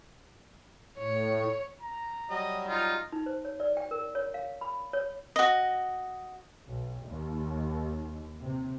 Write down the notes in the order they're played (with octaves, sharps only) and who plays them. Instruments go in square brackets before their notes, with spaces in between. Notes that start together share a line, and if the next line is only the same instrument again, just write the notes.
[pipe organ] A2 [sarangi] C#5
[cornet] A#5
[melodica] F#3 G3 [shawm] D#5
[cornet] D#4 [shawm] F4
[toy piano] D#4
C5
C#5
D5
G5
A#4
C#5
F5
B5
C#5
[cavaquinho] F#4 D#5
[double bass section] B1
D#2
C3